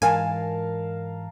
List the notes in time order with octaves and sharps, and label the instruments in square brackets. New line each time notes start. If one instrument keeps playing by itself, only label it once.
[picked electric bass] G#2 E3 [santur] A#4 F5 A5 [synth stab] G#5